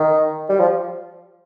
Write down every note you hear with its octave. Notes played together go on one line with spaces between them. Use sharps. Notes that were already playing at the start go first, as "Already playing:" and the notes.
Already playing: D#3
G3
F3